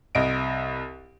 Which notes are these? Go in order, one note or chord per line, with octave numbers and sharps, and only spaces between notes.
C2 D#5 D7